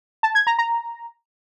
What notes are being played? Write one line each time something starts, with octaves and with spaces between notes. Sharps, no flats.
A5
G#6
A#5
A#5